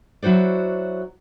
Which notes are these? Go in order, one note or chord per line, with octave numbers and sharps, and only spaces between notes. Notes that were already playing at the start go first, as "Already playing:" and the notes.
F#3 E4 F#4 C5 D5